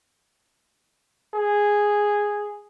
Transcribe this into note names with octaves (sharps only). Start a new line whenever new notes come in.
G#4